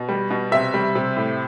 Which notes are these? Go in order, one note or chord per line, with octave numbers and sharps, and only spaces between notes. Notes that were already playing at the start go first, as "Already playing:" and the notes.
Already playing: B2
G3
B2
C3 E5
G3
C3
A2